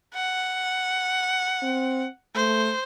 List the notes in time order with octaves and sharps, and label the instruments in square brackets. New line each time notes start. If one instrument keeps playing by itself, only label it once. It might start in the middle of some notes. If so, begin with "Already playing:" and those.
[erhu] F#5
[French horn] C4
[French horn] A3 [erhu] C5